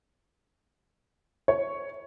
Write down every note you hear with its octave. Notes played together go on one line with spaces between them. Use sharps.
C#5